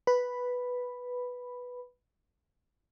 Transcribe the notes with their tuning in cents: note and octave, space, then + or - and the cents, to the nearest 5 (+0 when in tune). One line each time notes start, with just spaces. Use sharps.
B4 +0 B5 +0